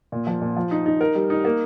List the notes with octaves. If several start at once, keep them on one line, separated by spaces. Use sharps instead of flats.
A#2
F3
A#2
F3
D#4
D#4
A#4
G3
D#4
A#3